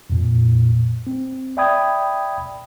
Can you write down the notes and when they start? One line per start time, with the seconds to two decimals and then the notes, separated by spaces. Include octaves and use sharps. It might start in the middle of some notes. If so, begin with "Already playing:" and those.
0.10 F2 A#2
1.07 C4
1.57 D5 E5 G5 B5 D#6 G#6